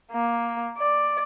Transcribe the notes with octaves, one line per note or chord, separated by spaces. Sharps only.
A#3
D5